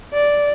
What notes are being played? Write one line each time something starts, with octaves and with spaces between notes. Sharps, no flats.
D5